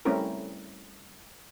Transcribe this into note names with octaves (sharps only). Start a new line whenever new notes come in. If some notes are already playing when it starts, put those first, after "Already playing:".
G3 A3 C4 C#4 E4 A#4